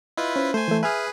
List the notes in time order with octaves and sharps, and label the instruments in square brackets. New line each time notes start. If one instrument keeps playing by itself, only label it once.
[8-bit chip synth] E4 F4 B4 [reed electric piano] D#5
[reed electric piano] C#4 C5
[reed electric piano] A3 [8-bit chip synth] C5 G#5
[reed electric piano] E3 A3
[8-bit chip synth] G#4 B4 [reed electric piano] E5 G#5 F6